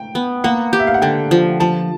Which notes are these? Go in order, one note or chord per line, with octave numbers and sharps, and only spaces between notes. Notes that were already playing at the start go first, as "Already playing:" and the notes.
Already playing: G5
B3
A#3 F#5
G4
E5
F5
F#5
D3 G5
F3
F3 A5